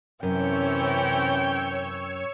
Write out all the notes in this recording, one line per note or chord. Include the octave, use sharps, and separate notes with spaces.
F#2 C3 E3 C#4 C#5 G5 E6 C#7